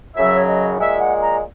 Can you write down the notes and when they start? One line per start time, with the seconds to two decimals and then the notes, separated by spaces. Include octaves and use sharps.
0.16 F#2 C#3 F#3 E5
0.35 C#5
0.47 D#5
0.79 A#2 G#3 E5
1.00 F#5
1.21 A#5